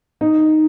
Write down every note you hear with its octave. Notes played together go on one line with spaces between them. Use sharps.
D#4